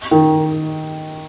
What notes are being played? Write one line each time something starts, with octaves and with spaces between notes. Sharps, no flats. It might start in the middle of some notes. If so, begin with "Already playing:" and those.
D#3